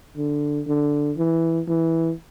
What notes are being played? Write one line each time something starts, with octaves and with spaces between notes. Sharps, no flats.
D3
D3
E3
E3